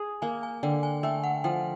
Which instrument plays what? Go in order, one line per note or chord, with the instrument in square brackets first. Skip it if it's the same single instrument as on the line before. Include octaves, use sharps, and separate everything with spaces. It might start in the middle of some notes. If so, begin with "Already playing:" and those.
Already playing: [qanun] G#4
[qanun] A#3 [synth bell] G#5
[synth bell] G#5
[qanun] D3 [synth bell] G5
[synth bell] G#5
[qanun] A3 [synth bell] G5
[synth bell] F#5
[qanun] F3 [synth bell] G5